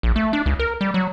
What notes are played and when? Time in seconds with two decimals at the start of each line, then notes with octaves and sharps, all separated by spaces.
0.03 A#1
0.16 A3
0.33 D4
0.46 C#2
0.59 A#4
0.81 G3
0.94 F#3